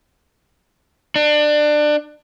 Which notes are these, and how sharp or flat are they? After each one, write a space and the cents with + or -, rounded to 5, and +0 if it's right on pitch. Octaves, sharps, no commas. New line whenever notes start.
D4 +25